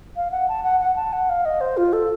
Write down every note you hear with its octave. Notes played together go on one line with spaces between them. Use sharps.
F5
F#5
A5
F#5
F#5
A5
F#5
F5
D#5
C5
F4
A4